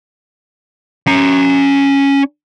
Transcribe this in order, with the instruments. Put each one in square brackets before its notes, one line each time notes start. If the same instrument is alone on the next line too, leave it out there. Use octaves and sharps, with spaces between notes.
[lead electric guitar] C#4 A#5